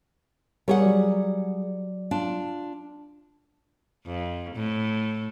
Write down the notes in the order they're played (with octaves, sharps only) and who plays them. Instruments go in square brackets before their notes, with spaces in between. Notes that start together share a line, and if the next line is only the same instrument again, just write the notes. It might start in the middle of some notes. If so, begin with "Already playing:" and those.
[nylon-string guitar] G3 G#4 F#5 [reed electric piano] A#4 C#5
[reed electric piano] F#3 D5
[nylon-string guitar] D4 F4
[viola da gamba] F2
A2